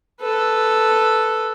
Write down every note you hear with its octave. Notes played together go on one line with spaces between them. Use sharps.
A4 B4